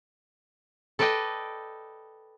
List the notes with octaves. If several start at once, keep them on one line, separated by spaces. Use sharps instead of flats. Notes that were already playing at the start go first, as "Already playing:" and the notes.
A4 B4 D5 D#5 G5